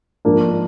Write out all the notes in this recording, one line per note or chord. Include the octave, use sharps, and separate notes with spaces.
G#2 F3 A#3 D4